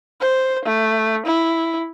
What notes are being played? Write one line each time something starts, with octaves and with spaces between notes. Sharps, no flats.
C5
A3
E4